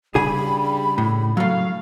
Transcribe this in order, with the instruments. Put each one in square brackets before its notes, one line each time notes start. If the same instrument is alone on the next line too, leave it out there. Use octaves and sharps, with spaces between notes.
[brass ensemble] G2 G3 [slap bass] C#3 D4 [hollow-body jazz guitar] G#4 G#5 [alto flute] B5
[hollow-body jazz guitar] A2
[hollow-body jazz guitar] F#3 A3 [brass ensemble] F5